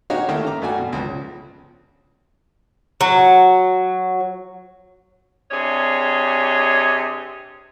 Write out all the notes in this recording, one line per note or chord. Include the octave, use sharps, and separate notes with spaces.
D#4 F#4 G4 C#5 D#5 F5
D#3 A3 A#3 C#4 E4
A#5 D6
G2 A3 F#4 G#5
B2
C#2 F3
F#3
C3 D4 G#4 C#5 D#5